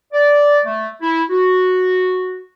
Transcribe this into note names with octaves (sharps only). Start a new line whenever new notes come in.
D5
A3
E4
F#4